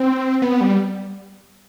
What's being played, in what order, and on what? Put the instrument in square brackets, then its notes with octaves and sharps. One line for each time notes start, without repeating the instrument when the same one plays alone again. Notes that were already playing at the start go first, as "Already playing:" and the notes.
Already playing: [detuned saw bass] C4
B3
G3